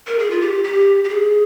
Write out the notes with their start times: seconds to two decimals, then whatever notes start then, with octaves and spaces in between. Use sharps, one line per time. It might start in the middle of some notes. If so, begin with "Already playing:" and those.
0.07 A#4
0.19 G#4
0.31 F4
0.41 G4
0.64 G4
1.04 G4
1.09 G#4